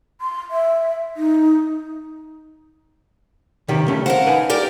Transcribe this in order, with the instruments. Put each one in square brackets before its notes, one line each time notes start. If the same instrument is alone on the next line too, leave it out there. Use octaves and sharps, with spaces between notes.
[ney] C6
E5
D#4
[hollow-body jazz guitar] C3 D#3 G4
C#3 A3 C#4
[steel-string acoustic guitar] A#4 F5 F#5 [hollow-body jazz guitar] C5
[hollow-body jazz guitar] D#4 B4 G#5
[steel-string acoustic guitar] G4 A#4 D5